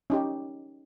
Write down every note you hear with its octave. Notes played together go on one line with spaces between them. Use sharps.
C#4 D#4 G4